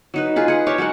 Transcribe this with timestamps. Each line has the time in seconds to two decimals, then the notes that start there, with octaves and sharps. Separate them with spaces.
0.14 F#3 D#4 B4
0.36 F4 G#4 B4
0.48 G#4 F#5
0.67 G4 A#4 C#5 A5
0.78 F#3 G#3 A#4 F#5